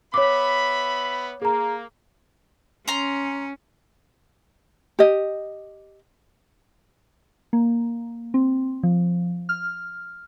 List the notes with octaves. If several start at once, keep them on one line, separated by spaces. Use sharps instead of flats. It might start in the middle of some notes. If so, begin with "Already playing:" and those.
B3 C#5 E5 B5 D6
A#3 G#4 A#5
C#4 A#5 C6
G4 D#5
A#3
C4
F3
F6